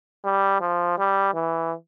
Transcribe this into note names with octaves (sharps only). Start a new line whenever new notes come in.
G3
F3
G3
E3